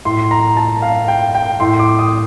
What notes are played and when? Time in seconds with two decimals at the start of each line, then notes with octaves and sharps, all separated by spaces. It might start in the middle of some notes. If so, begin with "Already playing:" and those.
0.05 A2 C6
0.31 A#5
0.57 A5
0.82 F5
1.08 G5
1.35 G5
1.60 A2 C6
1.79 D6
1.99 D#6